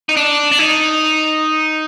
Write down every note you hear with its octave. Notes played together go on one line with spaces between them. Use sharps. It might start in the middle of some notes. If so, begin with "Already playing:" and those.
D#4
D4
D4
D#4